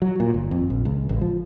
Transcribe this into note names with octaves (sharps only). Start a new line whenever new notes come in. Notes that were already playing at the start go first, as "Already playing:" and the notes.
F#3
A#2
G1
F2
A#1
C#2
A1
F3